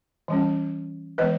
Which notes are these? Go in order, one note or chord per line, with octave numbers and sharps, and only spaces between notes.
E3 G3 C#4
E3 G#3 B3 B4 D#5